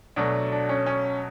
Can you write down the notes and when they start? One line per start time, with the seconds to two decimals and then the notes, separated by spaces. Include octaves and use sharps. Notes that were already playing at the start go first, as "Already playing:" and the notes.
0.16 B2 F#3 A3 D4
0.52 D4
0.69 C#4
0.86 C#4